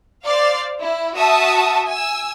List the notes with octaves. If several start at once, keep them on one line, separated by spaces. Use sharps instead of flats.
C5 D5 F5
E4
F#4 E5 A5 D#6
G#5 E6